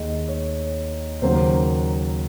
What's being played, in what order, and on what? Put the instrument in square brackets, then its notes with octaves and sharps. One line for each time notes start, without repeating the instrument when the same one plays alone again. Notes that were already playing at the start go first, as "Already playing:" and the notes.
Already playing: [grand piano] D#2 D#3 G#3 D#5
C#5
D#2 C#3 F#3 A#3 C5